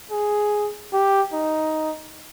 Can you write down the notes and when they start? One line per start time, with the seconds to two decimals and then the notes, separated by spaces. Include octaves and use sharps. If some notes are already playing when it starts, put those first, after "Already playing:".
0.11 G#4
0.93 G4
1.33 D#4